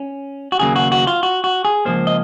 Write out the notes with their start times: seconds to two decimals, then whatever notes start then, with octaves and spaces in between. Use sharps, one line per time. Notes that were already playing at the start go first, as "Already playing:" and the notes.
Already playing: C#4
0.52 F#4
0.59 D#2 C#3 F#3 A#3 G#4
0.76 F#4
0.92 F#4
1.07 F4
1.23 F#4
1.44 F#4
1.65 G#4
1.85 C#2 C3 F3 A#3 C5
2.07 D#5